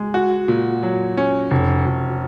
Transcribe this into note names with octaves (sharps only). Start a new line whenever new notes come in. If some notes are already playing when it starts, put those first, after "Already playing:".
Already playing: G#3
F#4
A#2
F#3
C#4
F1
F1